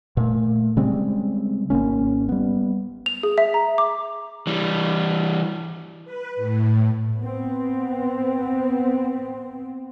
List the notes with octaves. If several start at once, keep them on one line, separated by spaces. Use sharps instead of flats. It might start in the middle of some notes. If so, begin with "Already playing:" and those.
A#2 A3
C#3 G3 G#3 C4
G#1 G#2 A#3 C#4
G3 B3
F7
G#4
E5
A#5
D6
E3 G3
B4
A2
B3 C4